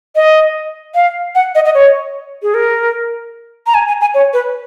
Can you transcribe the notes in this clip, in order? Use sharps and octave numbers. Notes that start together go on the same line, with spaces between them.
D#5
F5
F#5
D#5
D#5
C#5
G#4
A#4
A#5
G#5
G#5
G#5
C#5
B4